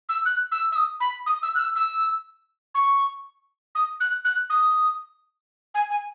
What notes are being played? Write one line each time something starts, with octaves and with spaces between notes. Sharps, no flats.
E6
F#6
E6
E6
D#6
B5
D#6
E6
F#6
E6
E6
C#6
D#6
F#6
F#6
D#6
G#5
G#5